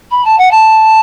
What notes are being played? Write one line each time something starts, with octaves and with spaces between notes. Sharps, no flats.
B5
A5
F#5
A5